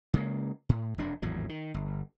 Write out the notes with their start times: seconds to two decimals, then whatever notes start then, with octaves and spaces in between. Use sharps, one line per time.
0.14 C#3 G#3 A#3
0.69 A2
0.98 F1 F#2 D4
1.22 G#1 E2 A2 F#3
1.49 D#3
1.74 G1